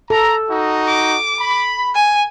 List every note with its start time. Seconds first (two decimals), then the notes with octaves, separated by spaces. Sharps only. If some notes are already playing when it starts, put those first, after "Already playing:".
0.10 A4 A#5
0.50 D#4 F#4
0.87 D6
1.40 B5
1.95 G#5